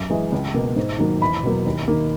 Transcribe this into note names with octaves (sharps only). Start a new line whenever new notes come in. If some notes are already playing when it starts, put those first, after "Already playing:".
Already playing: F#2
E3 G#3
C#2
B2 A#3
G#2
D#3 F#3 A#3
E2 B5
B2 F#3 A#3
D#2
D#3 A#3